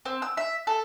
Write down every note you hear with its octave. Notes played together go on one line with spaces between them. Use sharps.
C4
E6
E5
A4